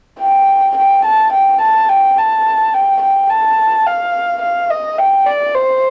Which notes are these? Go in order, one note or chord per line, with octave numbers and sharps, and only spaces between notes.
G5
G5
A5
G5
A5
G5
A5
G5
G5
A5
F5
F5
D#5
G5
D5
C5